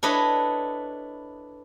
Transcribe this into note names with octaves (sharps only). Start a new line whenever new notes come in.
D4 E4 A4 B4 C#5 D#5